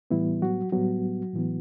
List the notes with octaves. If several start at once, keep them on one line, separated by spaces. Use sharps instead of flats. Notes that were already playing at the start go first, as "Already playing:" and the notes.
A2 E3 G3 B3 E4
F#3 F#4
A2 F#3 G3 B3 F#4
A2 E3 B3